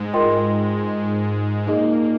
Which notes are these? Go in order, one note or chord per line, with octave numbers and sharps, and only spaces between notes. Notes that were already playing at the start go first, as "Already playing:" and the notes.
Already playing: G#2 G#3
F4 A#4 D#5 G5 C6
A#2 A#3 D#4 G#4 D#5